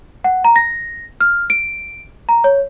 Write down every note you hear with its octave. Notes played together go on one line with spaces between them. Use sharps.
F#5
A#5
A#6
F6
D7
A#5
C#5